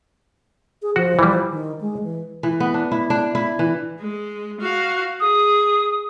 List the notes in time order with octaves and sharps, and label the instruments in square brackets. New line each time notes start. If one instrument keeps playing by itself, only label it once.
[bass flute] G#4
[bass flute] F3 [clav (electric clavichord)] F#4
[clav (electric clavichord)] E3 G3
[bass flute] D#3
G#3
E3
[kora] E3
B3
D4
E4
D4
E4
E3
[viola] G#3
F#4 F5
[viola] G#4 [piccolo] D#6